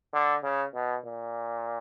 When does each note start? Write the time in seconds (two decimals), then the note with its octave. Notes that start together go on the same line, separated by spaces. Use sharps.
0.14 D3
0.43 C#3
0.74 B2
1.05 A#2